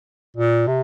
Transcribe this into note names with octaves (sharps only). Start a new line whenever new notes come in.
A#2
C3